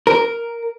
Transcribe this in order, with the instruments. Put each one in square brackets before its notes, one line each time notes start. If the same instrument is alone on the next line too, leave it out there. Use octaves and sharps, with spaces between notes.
[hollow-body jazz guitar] A#4